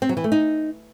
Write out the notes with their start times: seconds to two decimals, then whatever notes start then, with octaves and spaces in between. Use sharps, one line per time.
0.02 C4
0.09 F#3
0.17 E3
0.24 A3
0.32 D#4